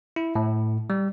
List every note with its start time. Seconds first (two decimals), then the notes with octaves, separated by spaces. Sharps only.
0.16 E4
0.35 A2
0.90 G3